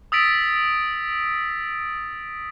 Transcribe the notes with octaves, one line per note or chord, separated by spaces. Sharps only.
D#6 E6 A6 B6 D7